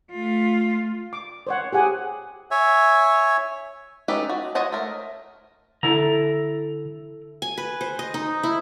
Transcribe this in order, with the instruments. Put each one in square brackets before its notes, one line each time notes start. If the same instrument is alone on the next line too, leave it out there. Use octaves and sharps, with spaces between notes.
[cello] A3 F4
[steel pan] D6
C5 C#5 F#5
G4 G#4 F#5 G#5
[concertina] C#5 E5 G#5
[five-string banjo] C#4 D#4 G4 A4 B4
F#4
C5 C#5 D#5 F#5 A5
A3 A#4
[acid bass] D3 [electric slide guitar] E4 A4 A#5
[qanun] G#5
B4
C5
D#5
D#4
E4